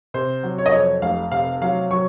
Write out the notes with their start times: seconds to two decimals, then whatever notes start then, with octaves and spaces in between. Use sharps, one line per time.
0.14 C3 C5
0.43 F#3
0.58 C#5
0.66 D#5
0.73 F2 C#5
1.02 F1 F5
1.32 C3 F5
1.61 F#3 F5
1.91 F#3 C#6